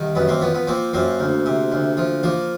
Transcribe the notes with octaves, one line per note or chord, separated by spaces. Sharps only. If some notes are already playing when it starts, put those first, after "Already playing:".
Already playing: C2 D#3
F#2 B3
A#3 C4
F3 B3
B3
F3 A#3 C4
F#2 A#3 C4
D2
C3
D2
F3
F3 A#3